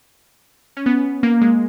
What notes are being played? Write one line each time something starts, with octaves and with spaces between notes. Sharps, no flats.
C#4
B3
A#3
G#3